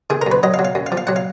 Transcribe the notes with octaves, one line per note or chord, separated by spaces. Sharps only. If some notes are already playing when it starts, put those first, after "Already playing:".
D#3 G#4
A#4
F#2
B4
F#3 D#5
F5
F#3
F5
F#2
F5
F3
F5
F#3 F#5
F5